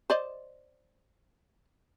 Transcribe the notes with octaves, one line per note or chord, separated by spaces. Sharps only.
C5 D5 D#5